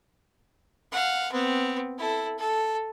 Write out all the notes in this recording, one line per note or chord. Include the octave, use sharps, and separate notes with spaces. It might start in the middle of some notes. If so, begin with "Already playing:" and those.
F5 F#5
B3 C4
E4 A4
A4